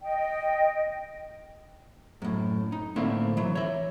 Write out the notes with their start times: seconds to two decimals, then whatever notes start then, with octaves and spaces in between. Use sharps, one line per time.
0.01 D#5 G5
2.22 F#2 A2
2.72 D#4
2.96 A2 D3 A#3 C4 E5
3.37 E3 F#3
3.55 C#5 E5